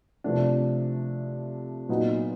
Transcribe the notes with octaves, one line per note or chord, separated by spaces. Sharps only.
C3 F3 A3 D4
A#2 F#3 B3 D#4